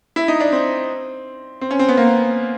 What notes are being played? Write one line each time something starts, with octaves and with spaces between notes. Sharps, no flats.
E4
D#4
D4
C4
C4
C#4
C4
B3
A#3